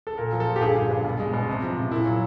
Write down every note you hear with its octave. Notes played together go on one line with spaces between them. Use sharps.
A4
A#2 A#4
F3
A4
A#2
G4
G2 G#4
D3
G2
B2
G#3
B2
C3
F3
C3
A#2 E4
F#3